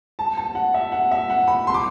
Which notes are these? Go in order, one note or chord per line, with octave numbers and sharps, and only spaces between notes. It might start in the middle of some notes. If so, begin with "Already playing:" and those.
A5
A5
F#5
E5
F#5
E5
F#5
B5
C6
D6